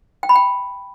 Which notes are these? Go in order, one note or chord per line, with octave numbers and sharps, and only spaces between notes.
G5
B5
G5